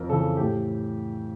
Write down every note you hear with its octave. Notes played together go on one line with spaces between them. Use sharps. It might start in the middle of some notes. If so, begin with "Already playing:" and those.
Already playing: F2 A#4
C#3 E3 A4
A2 G4